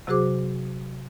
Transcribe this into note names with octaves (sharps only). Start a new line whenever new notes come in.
C3 F#3 F#4 G#4 C5 D6